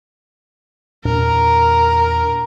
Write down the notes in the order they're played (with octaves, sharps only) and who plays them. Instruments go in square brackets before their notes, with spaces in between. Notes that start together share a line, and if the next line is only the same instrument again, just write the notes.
[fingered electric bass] E2 A#2 D4 [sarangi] A#4